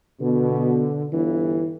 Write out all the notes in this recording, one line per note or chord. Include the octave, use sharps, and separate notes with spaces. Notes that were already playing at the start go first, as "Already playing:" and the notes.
B2 D3
G1 E3